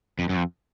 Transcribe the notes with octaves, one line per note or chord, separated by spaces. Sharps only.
F2
F#2
F2